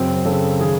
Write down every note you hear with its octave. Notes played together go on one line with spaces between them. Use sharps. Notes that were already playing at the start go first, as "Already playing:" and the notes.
Already playing: F#2 C#3 C4
C#3 A4
D#3 G#4